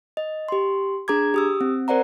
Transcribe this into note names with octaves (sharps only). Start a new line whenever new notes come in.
D#5
G4 C6
D4 G#4 A#5 D6 G#6
G4 D#6 E6
C4
A#4 C5 D5 F#5 A#5